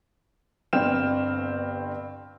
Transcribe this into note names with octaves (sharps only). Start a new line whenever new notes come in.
G1 G2 C4 G5 F6 E7